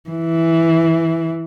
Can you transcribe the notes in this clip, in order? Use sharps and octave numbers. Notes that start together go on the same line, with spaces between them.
E3